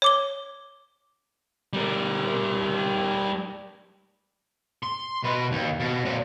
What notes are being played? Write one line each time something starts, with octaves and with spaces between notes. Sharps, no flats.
C#5 D6 G7
G3 A#4
C6
B2 B4
D#2
B2
A#2 C4